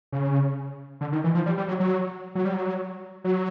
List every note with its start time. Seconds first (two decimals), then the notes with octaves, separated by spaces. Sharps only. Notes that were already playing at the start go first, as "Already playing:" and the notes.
0.12 C#3
1.01 D3
1.12 D#3
1.24 E3
1.35 F3
1.46 G3
1.58 G3
1.68 F#3
1.80 F#3
2.35 F#3
2.45 G3
2.53 F#3
3.24 F#3